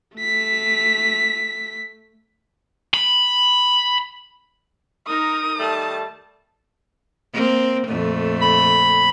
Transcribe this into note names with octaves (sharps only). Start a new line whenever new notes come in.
A3 B6
B5
D#4 A#4 D#6
D#3 G3 A3 A5
A#3 C4
F2 A#2 A3
B5